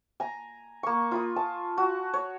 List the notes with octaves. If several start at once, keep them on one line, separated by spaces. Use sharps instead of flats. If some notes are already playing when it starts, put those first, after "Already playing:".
G#5 A#5
A#3 C#6
F4 B5 D#6
G#5 A5
F#4
C#5